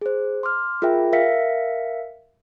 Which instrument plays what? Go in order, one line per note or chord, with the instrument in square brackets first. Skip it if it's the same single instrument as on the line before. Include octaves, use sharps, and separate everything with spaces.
[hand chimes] G#4 C5
C6 D6 F6
F4 G#4 A#4 E5 G5
A#4 E5 F5 B6 C#7